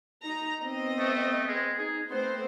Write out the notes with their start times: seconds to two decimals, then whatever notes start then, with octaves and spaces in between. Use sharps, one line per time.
0.21 D#4 A#5
0.61 B3 C4 D#5
0.99 A3
1.47 G#3
1.78 D#4 G#4
2.11 A3 B3 C4 C5